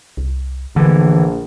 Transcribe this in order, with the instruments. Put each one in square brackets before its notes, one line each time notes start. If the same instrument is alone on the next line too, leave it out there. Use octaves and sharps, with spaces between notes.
[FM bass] C2
[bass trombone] A#1 [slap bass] D3 E3 [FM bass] A3